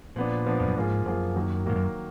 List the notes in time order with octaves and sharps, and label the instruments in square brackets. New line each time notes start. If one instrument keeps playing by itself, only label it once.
[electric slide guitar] A#2 [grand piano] F3 B3 D4
[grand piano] F3 B3 D4
[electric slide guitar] F2
F#2
[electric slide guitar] G#2 [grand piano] F3 A#3 F4 G#4
[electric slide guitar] F#2 [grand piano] F3 A#3 F4 G#4
[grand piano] D#3 F#3 A#3
[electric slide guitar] G#2 [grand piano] D#3 F#3 A#3
[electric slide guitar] F#2